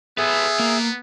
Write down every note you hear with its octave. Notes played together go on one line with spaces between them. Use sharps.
B3 G#4 A4 B4 E5
A#3